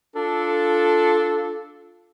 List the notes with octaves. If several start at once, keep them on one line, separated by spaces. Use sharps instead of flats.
D4 F4 A4